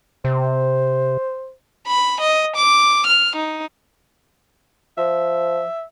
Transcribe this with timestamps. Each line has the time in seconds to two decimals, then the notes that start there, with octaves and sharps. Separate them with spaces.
0.25 C3 C5
1.87 B5
2.21 D#5
2.56 D6
3.06 F6
3.36 D#4
4.98 F3 E5